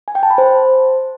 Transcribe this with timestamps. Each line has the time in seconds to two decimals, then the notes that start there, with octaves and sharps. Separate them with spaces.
0.08 G#5
0.15 G5
0.23 A5
0.30 B5
0.38 C5